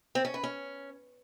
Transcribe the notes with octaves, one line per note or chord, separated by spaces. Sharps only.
C4
C#4
B4
C#4